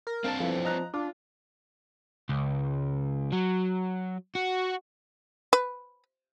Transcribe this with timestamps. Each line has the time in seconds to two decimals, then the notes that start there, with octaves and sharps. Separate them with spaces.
0.07 A#4
0.24 C4 D4 F5 A5
0.40 F3 B3 E4 A4
0.65 D#5 A#5 F#6
0.94 D4 F4
2.29 C#2
3.32 F#3
4.35 F#4
5.53 B4